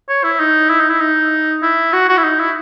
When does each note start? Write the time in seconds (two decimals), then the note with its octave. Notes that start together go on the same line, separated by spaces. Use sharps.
0.09 C#5
0.23 E4
0.39 D#4
0.70 E4
0.80 D#4
0.90 E4
1.00 D#4
1.62 E4
1.93 F#4
2.09 F#4
2.17 E4
2.24 D#4
2.39 E4